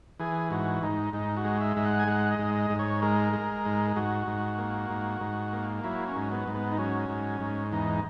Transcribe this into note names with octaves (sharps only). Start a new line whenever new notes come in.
E3 G#4
G#2 F#4
G#2 D#4
G#2 D#4
F#4
G#3
E5
G#2 E5
F#5
G#5
G#3 F#5
D#5
G#2
D#5
G#2
C#5
G#3 A#4
G#3
G#2
G#2 F#4
G#2
A#3
G#2
G#2
A#3
F#3 E4
C#4
G#2
B3
G#2
B3
D#4
F#3 C#4
G#2
G#2
E2 D#4